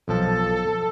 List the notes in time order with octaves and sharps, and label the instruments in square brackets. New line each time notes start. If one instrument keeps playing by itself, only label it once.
[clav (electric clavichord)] B1 F3 A5 [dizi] A4